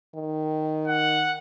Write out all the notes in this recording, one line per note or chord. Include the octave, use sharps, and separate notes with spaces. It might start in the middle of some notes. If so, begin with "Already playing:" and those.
D#3
F#5